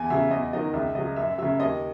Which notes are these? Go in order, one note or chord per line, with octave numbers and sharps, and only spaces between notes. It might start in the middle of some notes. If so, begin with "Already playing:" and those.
Already playing: E2 G#5
C#3 F#3 E5
E2 D#5
D#3 F#3 D#5
C#2 E5
C#3 F#3 D#5
F#2 E5
C#3 F#3 E5
D#2 D#5